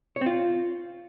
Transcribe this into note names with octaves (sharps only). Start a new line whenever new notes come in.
C#5
C4
F4